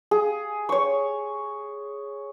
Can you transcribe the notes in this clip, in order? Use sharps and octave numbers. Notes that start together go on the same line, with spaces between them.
G#4
C#5 C#6